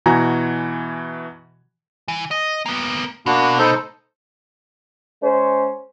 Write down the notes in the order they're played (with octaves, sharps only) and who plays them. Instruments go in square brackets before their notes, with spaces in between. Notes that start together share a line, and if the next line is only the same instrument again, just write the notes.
[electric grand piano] B2 E3 F#4 G#5 A#5
[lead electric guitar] E3
D#5
A#3 B3
[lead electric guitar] B2 [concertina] A#3 D4 F#4
[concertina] D#4 A4 C5
[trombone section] G#3 C#4 C5